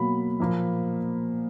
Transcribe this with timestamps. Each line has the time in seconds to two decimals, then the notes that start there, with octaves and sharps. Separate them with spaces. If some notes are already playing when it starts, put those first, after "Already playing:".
Already playing: B2 F#3 A#3 B5
0.40 A#2 F3 A#3